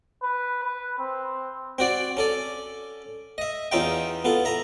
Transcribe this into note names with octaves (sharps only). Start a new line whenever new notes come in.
B4
B4
C4
C4 F#4 D5
C#4 A4 D5
D#5 E5
E2 C#4 D#4 F4 E5 G5
B3 F4 A4
E5 A#5